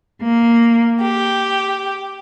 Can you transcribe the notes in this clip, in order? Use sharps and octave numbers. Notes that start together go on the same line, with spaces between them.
A#3
G4